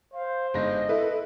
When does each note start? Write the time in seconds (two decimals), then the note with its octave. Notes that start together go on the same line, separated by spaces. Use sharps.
0.14 C5 F5
0.54 G1 G#2 D#5 A#6
0.89 E4 A4 B4 E5